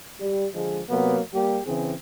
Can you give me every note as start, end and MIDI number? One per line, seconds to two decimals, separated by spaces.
0.20 0.46 55
0.54 0.81 50
0.54 0.81 53
0.54 0.81 56
0.90 1.19 48
0.90 1.19 54
0.90 1.19 58
0.90 1.19 59
1.34 1.60 55
1.34 1.60 58
1.34 1.60 67
1.66 1.94 49
1.66 1.94 52
1.66 1.94 60
1.66 1.94 68